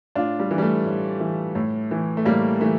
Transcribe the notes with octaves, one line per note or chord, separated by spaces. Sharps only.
A2 D4 F4
G3
E3
G3
A3
A2
E3
A2
E3
A3
A2 G3 A#3
E3 A3